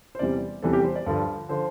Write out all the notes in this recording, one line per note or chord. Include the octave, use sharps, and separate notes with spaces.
C5
E2 C3 E3 G3 D5
E2 C3 E3 G3 A4
G4
C5
D5
G2 D3 F3
D3 F3 C5